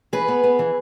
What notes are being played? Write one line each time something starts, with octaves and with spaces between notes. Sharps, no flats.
E3 G#4 B4
B3
B3
E3